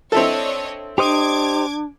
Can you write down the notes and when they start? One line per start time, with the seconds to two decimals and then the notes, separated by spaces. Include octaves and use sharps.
0.12 C4 D4 E4 A4 C#5 D#5
0.98 D4 G4 C5 D#5 D6 G#6